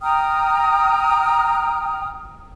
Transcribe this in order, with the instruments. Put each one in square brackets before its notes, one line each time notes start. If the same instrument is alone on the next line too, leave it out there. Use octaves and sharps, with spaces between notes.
[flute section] G5 A#5 D#6 F6